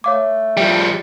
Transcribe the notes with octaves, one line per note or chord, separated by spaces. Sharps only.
A3 C#5 F5 D6
F3 G3 G5